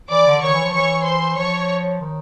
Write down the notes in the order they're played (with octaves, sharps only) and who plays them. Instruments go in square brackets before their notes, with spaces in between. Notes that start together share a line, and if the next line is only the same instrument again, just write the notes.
[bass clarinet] E3 [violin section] D5 D6
[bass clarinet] D3
[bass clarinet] D#3 [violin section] C#5 C#6
[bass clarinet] E3
F3
[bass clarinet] E3 [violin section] C#5 C#6
[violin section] C5 C6
[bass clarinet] F3 [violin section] C#5 C#6
[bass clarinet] D#3